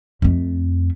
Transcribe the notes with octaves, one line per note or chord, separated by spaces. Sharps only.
F2 A3